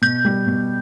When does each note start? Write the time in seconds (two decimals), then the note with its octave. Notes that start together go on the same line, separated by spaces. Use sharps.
0.02 B2 G6
0.25 G3
0.47 B2